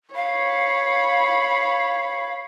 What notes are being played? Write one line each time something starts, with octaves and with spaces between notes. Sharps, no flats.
C#5 F5 B5